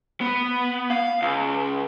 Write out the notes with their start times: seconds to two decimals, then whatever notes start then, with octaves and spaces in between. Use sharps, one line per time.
0.21 B3
0.90 F5
1.22 C#2